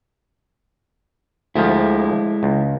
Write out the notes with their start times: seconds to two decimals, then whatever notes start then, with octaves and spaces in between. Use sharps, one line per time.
1.56 D2 F3 G#3 E4
2.43 C#2